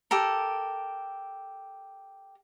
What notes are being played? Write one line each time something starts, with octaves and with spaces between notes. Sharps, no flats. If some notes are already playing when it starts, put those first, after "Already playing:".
G4 A4 A#4